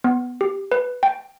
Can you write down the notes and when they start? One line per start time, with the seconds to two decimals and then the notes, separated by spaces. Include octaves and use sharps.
0.04 B3
0.41 G4
0.72 B4
1.03 G5